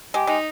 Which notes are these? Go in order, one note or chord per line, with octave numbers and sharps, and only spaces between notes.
G#3 G4
G#3 D#4